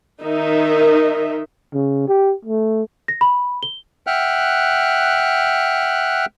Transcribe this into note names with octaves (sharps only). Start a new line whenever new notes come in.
D#3 D#4 A#4 E5
C#3
G4
A3
A#6
B5
G7
E5 F#5 G5 F6 F#6